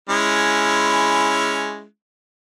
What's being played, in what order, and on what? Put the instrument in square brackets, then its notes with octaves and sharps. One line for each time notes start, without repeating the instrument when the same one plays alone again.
[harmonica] G#3 C#4 E4